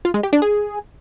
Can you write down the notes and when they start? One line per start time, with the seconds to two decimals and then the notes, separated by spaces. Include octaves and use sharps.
0.05 F4
0.14 G#3
0.23 G4
0.33 D4
0.42 G#4